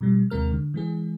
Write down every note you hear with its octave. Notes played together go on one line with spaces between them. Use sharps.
B2 F3 G3
D#2 C3 G#3 A#4 F6
D3
E3 G#3 G#4